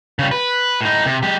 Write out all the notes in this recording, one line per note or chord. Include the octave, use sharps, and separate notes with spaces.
C#3 G3
B4
A2 D#4
C3
G#3 G4